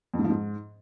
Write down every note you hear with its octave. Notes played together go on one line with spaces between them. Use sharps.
F2
G#2
F3
G#2